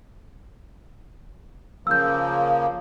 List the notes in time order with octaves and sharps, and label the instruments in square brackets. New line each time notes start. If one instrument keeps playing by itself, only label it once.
[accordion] C#3 F3 A#3 [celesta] E6 G6